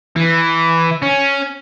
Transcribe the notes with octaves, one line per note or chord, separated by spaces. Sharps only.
E3
C#4